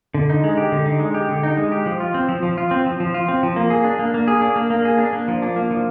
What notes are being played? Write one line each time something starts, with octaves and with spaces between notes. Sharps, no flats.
D3
D#4
G#3
G4
D3
D#4
G#3
G4
D3
D#4
G#3
G4
F3
F4
C4
F3
F3
F4
C4
F3
F3
F4
C4
F3
A#3
G#4
D4
A#3
A#3
G#4
D4
A#3
A#3
G#4
D4
A#3
F3
D4
A#3
F3